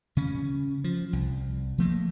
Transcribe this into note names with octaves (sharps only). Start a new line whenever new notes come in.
C#3 C#4
F3
C2
F3 A3 A#3